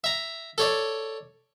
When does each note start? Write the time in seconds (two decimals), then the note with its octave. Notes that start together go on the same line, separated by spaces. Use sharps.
0.04 E5 A#5
0.58 A4 C#5 D5